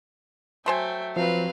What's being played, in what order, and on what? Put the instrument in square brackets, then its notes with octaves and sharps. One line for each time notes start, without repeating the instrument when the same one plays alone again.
[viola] F#3 G5 [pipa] A3 C5 G#5 [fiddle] E5
[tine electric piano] F3 [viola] F#3 C4 [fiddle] B4 F5